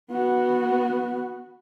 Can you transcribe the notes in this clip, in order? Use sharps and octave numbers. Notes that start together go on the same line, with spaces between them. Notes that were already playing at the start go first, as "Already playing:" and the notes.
B3 F#4